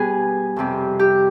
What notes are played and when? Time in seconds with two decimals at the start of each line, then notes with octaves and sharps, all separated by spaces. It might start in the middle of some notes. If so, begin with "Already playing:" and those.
Already playing: B2 G3 G#4 B4
0.56 F2 C3 G3
0.99 G4